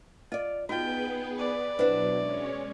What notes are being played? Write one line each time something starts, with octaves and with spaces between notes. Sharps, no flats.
F4 D5 D#5
B3 D#4 F4 F#4 G#4 B4 G5
D5
B2 F#3 D4 E4 B4 C5 F#5
G#3 C#4 C#5